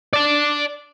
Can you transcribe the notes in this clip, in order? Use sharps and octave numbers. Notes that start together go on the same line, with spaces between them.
D5 A5